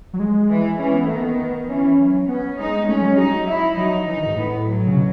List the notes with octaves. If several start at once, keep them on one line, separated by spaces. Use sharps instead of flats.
F#3
G#3
E3
E3 C#4
B3
D#3 A3
B3
E3 C#4
F#3
B3 C#4
G#3 D#4
A3 C#4
G#3
F#3
G#3
F#3 D#4
E4
F#3 D#4
E3 D#4
D#3
G#2
A2 B3
F#3
C#3
B2